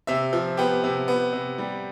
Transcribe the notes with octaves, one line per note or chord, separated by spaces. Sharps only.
C3 E5
F3
B3 G4
C3
B3
C3
G3